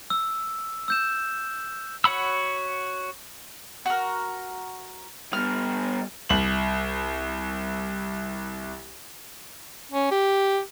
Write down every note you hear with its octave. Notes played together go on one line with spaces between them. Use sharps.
E6
E6 G6 E7
F#4 C#5 F#5 B5 E6
F#4 A#4
G3 B3 F6
C2 F#7
C#4
G4